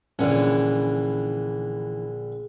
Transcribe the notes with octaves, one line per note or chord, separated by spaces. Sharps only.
A#1 D3 E3 C#4 G#4